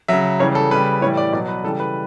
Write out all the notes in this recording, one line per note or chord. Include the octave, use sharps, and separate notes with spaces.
C#3 F#3 E5
C#3 E3 G3 C#5
A4
C#3 G3 B4
A2 E3 G3 C#5
D5
B2 F#3 D5
B4
C#3 E3 G3 A4
B4